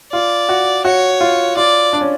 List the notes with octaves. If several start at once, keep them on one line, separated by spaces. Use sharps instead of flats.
F4 D5
F#4
F#4 C#5
F4
F4 D5
D4
C#4